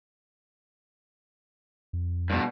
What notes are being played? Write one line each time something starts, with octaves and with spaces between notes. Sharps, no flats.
F2
G2 B2